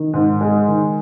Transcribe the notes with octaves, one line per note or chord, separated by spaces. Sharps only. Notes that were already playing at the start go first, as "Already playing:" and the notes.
Already playing: D#3
G#2
G#3
D#3